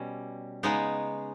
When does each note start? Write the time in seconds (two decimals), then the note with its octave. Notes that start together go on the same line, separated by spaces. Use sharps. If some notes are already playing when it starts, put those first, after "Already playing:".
Already playing: B2 G3 C#4
0.63 C#3 G#3 B3 D#4